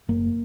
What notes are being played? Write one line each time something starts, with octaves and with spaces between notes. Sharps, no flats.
F#1 A#3